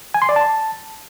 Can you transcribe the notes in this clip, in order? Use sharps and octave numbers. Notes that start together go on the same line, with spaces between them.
G#5
C6
D5
A5